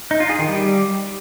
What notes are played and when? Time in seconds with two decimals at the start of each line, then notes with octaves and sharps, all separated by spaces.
0.11 D#4
0.20 F4
0.30 G#4
0.39 D#3
0.48 G3